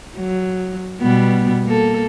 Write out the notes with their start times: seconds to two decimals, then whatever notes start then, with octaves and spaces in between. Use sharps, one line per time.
0.17 F#3
1.01 B2 G3 B3
1.65 A#3 A4